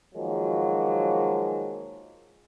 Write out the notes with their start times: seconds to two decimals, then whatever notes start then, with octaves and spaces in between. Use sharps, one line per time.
0.15 D#3 F3 F#3 G#3 A#3